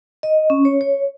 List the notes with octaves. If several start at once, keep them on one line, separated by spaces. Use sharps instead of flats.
D#5
C#4
C#5
C#5